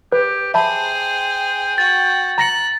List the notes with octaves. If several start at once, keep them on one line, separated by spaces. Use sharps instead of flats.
G4 B4
G#4 C5 E5 G5 A5 B5
F#4 A6
A#5 F#6 A#6 C#7